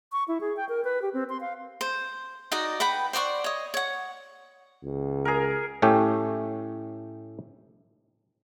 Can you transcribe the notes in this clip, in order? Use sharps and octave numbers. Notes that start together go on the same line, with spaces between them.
C#6
E4
G#4
G5
A#4
B4
G4
C4
C6
F5
C5
D#4 F#4 D5 D#5
B4 F#5 G5 B5
C5 D5 F#5 C#6
C#5 D#5
C#5 F#5
C#2
G#4 A#4
A2 A3 C#4 G4